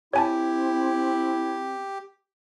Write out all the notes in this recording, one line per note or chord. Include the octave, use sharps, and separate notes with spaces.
C4 E4 G4 C#5 G#5 A5